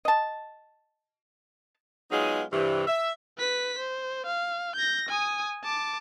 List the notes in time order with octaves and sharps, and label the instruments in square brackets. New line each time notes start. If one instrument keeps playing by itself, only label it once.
[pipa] D#5 A5
[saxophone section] F#3 G#3 B3 D#4 F4 G#4
G2 C3 E3
E5
[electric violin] B4 B6
C5
F5
G6 A#6
G#5 D#6
A5 D6